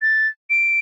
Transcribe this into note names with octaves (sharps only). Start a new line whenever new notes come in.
A6
D7